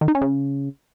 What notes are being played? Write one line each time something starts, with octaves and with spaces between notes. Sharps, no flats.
D#3
D#4
C#4
C#3